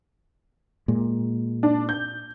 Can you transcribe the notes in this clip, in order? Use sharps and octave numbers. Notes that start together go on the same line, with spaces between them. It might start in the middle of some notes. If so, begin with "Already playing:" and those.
A#2 G#3
D4
G6